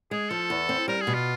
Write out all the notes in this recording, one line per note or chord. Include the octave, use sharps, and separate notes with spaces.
G#3 G#4
F3 A4
E2
C4
G3 A#4
G#4
B2
F4